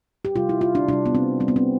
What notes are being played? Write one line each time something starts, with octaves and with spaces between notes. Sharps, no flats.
G4
C3 G3 F4
E4
F4
D4
C3 G3 D4
B3
C4
C3 G3 C4
B3
C4